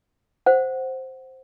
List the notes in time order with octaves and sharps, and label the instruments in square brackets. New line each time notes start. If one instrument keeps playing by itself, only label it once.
[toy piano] C5 F#5